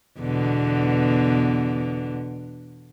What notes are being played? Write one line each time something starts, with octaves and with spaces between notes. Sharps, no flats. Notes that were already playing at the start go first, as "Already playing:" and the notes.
E2 B2 D3